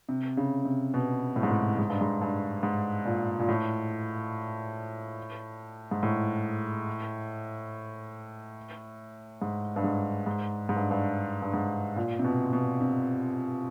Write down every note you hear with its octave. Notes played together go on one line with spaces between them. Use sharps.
C3
C#3
C3
B2
A2
G#2
A2
G#2
G2
G#2
G2
G#2
A#2
A#2
A2
G#2
A2
G#2
G2
G#2
G#2
G#2
G2
G2
G2
G#2
A#2
C3
B2
B2
C3